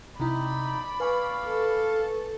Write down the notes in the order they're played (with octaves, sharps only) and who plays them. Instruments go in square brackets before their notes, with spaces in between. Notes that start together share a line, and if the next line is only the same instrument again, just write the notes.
[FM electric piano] C3 E4 [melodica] D#4 [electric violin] D5 B5
[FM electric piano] B4 G#5 C#6 [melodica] F5
[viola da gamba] A4